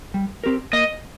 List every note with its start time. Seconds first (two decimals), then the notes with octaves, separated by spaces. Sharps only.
0.14 G3
0.44 C4 G4 A#4
0.73 A#3 D#5